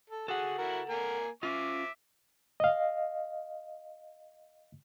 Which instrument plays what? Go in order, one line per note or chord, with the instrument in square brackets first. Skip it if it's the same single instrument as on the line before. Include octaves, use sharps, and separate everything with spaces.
[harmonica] A4
[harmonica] F#4 G#4 [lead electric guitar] A4 F#5
[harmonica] E4 F#4 A#4
A#3 A#4 G#5
[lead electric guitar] C#4 F4 [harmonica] E5 D6
[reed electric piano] D#5 F5